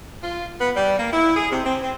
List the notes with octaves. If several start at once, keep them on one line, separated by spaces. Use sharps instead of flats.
F4
B3
G3
A#3
E4
G#4
C3
C4
C4